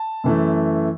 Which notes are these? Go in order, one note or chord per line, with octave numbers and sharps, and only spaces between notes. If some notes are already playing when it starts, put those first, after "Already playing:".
Already playing: A5
F#2 E3 A3